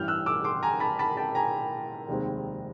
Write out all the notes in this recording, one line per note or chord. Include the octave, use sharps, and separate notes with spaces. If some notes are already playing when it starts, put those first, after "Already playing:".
Already playing: A1 G2 E3 F6 G6
E6 F#6
D6 E6
C6 D6
G#5 A#5
A5 B5
A5 B5
G5 A5
G#5 A#5
F1 D#2 D#3 G#3 C4